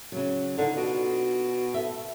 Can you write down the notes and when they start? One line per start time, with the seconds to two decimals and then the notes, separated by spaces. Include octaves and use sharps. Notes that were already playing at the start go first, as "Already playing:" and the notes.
0.12 C#3 F#3
0.58 D3 D4 D#4 F4
0.77 B2
1.74 A4 E5